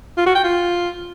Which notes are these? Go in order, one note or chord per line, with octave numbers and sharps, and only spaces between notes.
F4
F#4
G5
F4